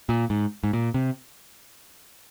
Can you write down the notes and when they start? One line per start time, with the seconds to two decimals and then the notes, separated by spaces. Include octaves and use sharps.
0.09 A#2
0.30 G#2
0.64 G#2
0.73 A#2
0.94 C3